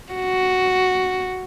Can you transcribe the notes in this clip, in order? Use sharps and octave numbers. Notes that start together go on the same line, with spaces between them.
F#4